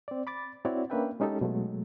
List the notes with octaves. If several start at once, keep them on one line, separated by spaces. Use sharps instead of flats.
C4 D5
B5 D6 A6
C4 E4 F#4 C#5 D5
A#3 C#4 D4 B4 E5 G5
G#3 C#4 D#4 G4 A4
B2 F#3 G#3 A3